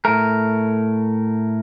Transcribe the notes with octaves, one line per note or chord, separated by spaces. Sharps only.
A2 A3 A#4